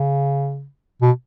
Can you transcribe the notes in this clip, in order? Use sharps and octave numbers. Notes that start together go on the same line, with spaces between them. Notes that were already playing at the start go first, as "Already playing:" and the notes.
Already playing: C#3
B2